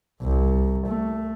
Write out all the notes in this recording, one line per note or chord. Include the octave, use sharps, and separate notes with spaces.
C2
A3